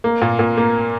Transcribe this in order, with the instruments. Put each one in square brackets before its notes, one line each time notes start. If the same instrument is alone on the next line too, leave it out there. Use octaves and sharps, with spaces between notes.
[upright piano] A#3
A#2
A#2
A#3